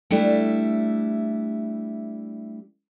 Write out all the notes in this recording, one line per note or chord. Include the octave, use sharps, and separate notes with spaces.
G3 A3 D4 E4